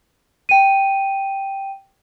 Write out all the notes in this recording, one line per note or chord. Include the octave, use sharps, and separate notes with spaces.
G5 D#7